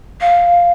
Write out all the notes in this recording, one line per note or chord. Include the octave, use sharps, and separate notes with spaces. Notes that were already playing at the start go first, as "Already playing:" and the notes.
F5